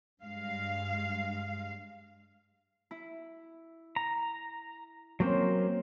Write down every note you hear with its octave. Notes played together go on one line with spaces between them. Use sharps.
G2 G#3 F5
E4
A#5
F#3 A#3 C4 C#4 C5